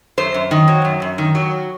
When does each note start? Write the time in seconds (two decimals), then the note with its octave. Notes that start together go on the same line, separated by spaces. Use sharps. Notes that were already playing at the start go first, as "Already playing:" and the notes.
0.18 F#2 C5
0.34 F#2
0.51 D#3
0.68 F#3
0.85 F#2
1.02 F#2
1.18 D#3
1.35 F#3